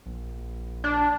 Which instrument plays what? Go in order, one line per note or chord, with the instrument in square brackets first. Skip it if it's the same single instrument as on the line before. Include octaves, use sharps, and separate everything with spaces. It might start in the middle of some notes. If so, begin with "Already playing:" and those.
[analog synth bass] A#1
[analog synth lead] D4